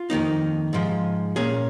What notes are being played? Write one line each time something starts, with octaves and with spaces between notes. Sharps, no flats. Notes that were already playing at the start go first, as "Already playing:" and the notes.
Already playing: F4
F2 D#3 A#3 D#4
G#2 F3 G#3
A#2 A#3 C#4 G#4